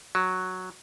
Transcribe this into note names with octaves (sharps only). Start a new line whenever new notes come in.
F#3